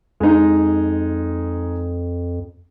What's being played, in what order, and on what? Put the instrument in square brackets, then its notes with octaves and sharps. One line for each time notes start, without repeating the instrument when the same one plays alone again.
[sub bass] F2 [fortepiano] G#3 D#4